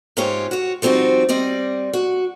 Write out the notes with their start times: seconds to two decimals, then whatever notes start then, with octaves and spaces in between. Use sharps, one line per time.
0.17 G#2 C#4 F4 G4 C#5
0.51 F#4 C#5
0.82 F3 G3 C4 D#4 F#4
1.29 G3 C4 D5 D#5
1.93 F#4